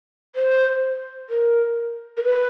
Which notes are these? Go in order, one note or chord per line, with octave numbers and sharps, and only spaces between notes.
C5
A#4
A#4
B4